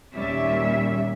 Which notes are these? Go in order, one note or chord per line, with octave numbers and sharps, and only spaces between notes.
D#2 A#2 G3 C#4 E5